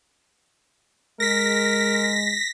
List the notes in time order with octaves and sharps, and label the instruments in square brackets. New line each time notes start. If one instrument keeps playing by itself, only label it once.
[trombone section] G#3 [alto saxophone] A#4 [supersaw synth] A#6 B6